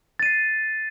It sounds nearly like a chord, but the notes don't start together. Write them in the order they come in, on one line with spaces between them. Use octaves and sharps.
A6 D#7 C7